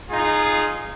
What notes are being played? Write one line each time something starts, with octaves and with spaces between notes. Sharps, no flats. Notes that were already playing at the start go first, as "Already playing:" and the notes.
D#4 F4 G#4